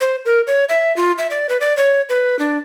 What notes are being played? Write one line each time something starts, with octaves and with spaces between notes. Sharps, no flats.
C5
A#4
C#5
E5
F4
E5
D5
B4
D5
C#5
B4
D4